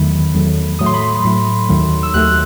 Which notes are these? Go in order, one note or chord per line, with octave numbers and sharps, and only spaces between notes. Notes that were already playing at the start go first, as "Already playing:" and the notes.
Already playing: E2 D#3 F#3 A3 B5
E2 D#3 F#3 A3
A2 F#3 A3 D#6
C6
B5
C6
A2 F#3 A3
D#2 D#3 F#3 A3
E6
D#2 D#3 F#3 A3 F#6